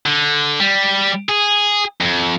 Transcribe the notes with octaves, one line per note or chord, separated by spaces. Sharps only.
D3
G3
G#4
F2